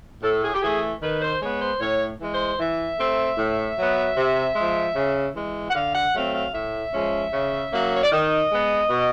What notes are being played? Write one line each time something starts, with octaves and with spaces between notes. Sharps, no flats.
A2 A4
G#4
G4
E3 A3 G#4
D#3 B4
C5
G#3 B3 C#5
C5
A2 C#5
E3 G#3
C5
E3 E5
A3 C4
A2
F#3 B3
C3
F3 G#3
C#3
E3 G#3
F#5
D3 F5
F#5
F#3 A3 C4 F5
F5
A2 E5
F3 G#3 C#4
C#3
F#3 A#3 C#4
C#5
D5
D#3 D#5
G#3 B3
B2